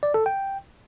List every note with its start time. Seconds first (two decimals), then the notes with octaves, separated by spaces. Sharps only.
0.03 D5
0.14 A4
0.26 G5